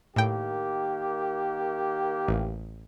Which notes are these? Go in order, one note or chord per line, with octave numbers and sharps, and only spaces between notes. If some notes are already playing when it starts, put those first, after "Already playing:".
A2 D#3 A#3 G4 G5
A1